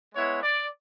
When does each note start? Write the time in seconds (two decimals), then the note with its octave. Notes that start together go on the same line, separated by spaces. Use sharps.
0.15 G#3 B3 E4 C#5
0.43 D5